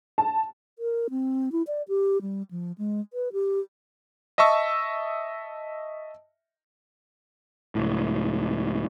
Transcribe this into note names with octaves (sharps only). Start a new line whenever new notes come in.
A5
A#4
C4
E4
D5
G4
G3
F3
G#3
B4
G4
D#5 E5 A5 C#6 E6
C#2 A2